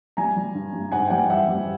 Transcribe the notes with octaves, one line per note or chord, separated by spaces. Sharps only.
G3 G#5 A#5
G3
G2
G3
G#2 F#5 G#5
G5
G3 F#5 G#5
E3 E5 F#5
G3